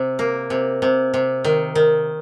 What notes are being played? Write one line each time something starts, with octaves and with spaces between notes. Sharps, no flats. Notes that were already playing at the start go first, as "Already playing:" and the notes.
Already playing: C3
A#3
C3
C3
C3
D#3
D#3